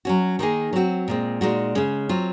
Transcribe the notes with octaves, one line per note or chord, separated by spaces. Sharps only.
F#3 C#4 F#4
D#3 A#3 D#4 G#4
F#3 C4 F#4
A#2 G#3 C4
A#2 G#3 D#4 F#4
C#3 G#3 C#4
F#3 C4 F4